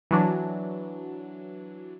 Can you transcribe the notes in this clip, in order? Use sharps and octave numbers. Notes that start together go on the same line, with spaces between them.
E3 F#3 D4